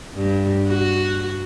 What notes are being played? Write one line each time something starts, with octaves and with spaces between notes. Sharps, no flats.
G2
F#4